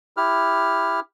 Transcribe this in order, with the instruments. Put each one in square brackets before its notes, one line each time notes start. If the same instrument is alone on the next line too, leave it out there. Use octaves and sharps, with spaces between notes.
[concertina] E4 G4 F6